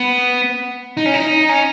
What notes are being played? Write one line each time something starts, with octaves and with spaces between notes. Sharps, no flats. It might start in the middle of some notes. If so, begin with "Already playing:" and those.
Already playing: B3
D#4
C#4
D#4
C#4